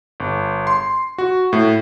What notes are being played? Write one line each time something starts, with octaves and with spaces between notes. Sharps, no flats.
G1
C6
F#4
A2